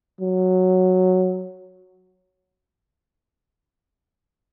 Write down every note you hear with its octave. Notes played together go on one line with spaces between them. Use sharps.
F#3